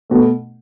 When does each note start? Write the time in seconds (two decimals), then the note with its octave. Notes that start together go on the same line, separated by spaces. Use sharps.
0.10 B2 A3